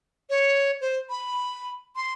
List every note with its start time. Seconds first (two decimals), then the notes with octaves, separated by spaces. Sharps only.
0.30 C#5
0.81 C5
1.10 B5
1.96 C6